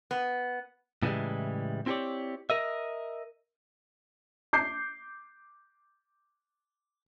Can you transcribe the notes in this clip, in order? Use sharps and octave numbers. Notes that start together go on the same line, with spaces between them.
B3
A2 C#3 E3 F3 G3 G#3
C4 E4 G4 A4 C#5 D5
A#4 D#5 E5
D6 G6 C7